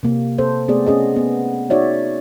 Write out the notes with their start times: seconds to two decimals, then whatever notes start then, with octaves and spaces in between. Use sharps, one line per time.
0.03 C3 A#3
0.38 C4 A4 C5
0.68 A3 B3 C4 G#4 D5
0.86 C#4 G#4 D#5
1.16 B3
1.70 D#4 F#4 C#5 D5 E5